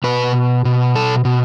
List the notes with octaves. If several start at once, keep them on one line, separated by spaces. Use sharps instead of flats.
B2 B4
B2
A4
B2